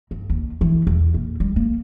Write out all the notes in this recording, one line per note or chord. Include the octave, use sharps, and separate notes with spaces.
G2
D#2
E3
E2
A#2
G3
A#3